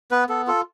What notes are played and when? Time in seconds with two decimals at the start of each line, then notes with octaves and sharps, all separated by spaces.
0.11 B3 B4
0.29 B3 A4
0.47 F4 A4